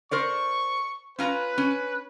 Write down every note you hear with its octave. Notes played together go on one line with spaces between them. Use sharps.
A#4 C5 D5 C#6
C#4 F4 B4 A#5
C#4